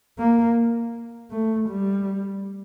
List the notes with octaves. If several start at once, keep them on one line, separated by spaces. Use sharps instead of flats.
A#3
A3
G3